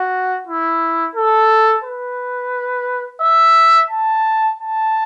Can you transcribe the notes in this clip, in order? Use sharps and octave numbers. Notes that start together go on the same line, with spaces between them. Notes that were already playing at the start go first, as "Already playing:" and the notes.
Already playing: F#4
E4
A4
B4
E5
A5
A5